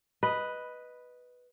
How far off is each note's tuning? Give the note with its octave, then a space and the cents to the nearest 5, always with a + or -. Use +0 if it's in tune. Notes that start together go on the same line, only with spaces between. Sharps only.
B4 +0 D#5 +0